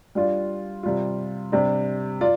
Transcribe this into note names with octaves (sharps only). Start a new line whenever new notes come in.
G3 D4 F4 D5
C3 G3 F4
C3 G3 D4
F4 D5